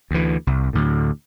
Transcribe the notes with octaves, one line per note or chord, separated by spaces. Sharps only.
D2 E3
C2
D2 A2